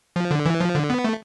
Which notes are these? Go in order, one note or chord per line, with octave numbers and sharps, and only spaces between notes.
F3
D3
E3
F3
D3
B3
A3